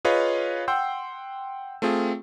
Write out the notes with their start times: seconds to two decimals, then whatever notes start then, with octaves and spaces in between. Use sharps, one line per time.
0.05 F4 G#4 B4 C#5 D#5 F5
0.68 F#5 G5 C6 E6 G6
1.82 A3 C4 F4 G#4